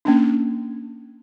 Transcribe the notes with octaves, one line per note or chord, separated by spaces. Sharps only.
A#3 C#4 D4